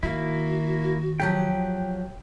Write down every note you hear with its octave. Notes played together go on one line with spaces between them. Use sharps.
D#3 A#3 E4 F#4
F3 F#3 G4 G5 G6